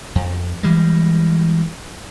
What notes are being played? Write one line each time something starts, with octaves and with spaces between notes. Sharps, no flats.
F2
E3 G3 G#3